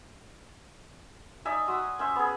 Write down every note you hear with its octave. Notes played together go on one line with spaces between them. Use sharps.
D#4 D5 E5 G#5
F#4 C6 D#6 E6
C#4 C5 E5
B3 G#4